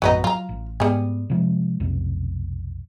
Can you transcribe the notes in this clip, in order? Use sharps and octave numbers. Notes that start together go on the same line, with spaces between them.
A#1 F#2 A2 F#3 B3 D#4
F#3 F4 A#5
A1
G#2 G3 B3 G#4
C3 F3 G#3
B1 F2 C3